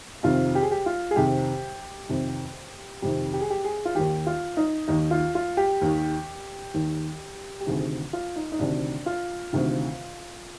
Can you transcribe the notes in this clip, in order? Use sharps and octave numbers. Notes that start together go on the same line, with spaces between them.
F2 C3 D#3 F4
G4
G#4
G4
F4
G#4
F2 C3 D#3 G4
F2 C3 D#3
F2 C3 D#3 G4
G4
G#4
G4
G#4
F4
D#2 D#3 G4
F4
D#4
D#2 D#3 D#4
F4
F4
G4
D#2 D#3
D#2 D#3
G4
D2 C3 D#3 G#4
F4
D#4
D#4
D2 C3 D#3 D4
F4
D2 C3 D#3